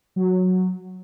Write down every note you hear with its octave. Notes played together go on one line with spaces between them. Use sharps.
F#3